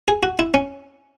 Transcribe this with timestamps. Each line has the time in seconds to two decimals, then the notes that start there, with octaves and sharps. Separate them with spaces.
0.08 G#4
0.23 F#4
0.39 E4
0.54 C#4